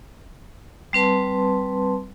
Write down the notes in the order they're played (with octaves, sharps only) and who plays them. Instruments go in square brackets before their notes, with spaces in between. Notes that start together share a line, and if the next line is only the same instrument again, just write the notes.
[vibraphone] G3 C4 B4 A5 C6